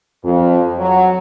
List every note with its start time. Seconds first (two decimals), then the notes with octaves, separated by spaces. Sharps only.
0.24 F2
0.79 F#3